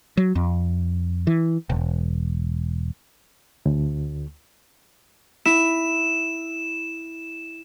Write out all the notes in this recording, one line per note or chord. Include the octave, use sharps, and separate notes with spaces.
F#3
F2
E3
E1
D2
E4 E7